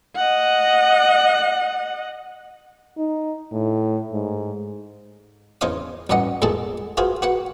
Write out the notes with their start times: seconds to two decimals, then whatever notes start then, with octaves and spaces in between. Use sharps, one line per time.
0.16 D#5 F#5
2.97 D#4
3.52 A2
4.12 G#2
5.61 E2 C#3 C5 D#5 F5 D#6
6.09 A1 D2 G2 C#4 D#5 F#5
6.42 E2 A#2 G#3 G#4 A4 A5
6.97 F4 F#4 G#4 B4 C5 F5
7.22 F#4 B4 F#5